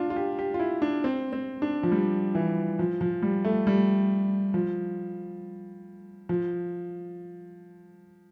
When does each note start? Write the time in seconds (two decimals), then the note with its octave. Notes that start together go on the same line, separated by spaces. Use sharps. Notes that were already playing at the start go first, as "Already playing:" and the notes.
Already playing: D4 F4
0.10 F4
0.16 G4
0.39 G4
0.54 F4
0.60 E4
0.82 D4
1.04 C4
1.33 C4
1.62 D4
1.83 F3
1.91 G3
2.35 E3
2.79 F3
3.01 F3
3.22 G3
3.45 A3
3.67 G3
4.54 F3
6.29 F3